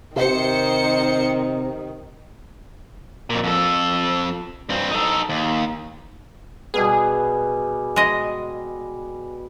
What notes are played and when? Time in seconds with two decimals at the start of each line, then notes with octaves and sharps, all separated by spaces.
0.16 C3 D#3 C5 C#7
3.30 F2 A#2
3.43 F2 A4
4.69 G2 C4
4.91 D#4 A4
5.29 D#2
6.74 B2 G3 B3 G#4
7.96 G#3 D#5